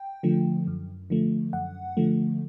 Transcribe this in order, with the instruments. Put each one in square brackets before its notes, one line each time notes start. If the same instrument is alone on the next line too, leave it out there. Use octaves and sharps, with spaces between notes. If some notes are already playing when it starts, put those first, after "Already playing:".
Already playing: [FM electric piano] G5
D3 F3 A3
F#2
D3 F3 A3
F#2 F#5
D3 F3 A3